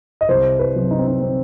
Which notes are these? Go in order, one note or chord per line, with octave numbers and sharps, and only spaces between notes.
D#5
C2 C5
B4
C3 F#3
D#4
C4
D#4
C4